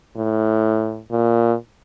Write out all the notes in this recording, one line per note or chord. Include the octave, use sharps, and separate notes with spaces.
A2
A#2